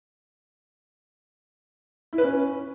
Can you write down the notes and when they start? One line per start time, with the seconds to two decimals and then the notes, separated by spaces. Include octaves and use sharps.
2.13 E4
2.18 B4
2.24 C#4